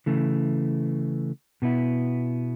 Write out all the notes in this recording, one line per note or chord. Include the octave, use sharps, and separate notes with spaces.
C#3 E3 A3
B2 B3 E4